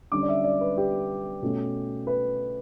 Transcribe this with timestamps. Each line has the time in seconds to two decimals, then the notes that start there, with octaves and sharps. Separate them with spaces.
0.12 D3 G3 C#4 D6
0.22 D5
0.28 E5
0.44 D5
0.61 B4
0.77 G4
1.42 B2 A3 C#4
2.07 B4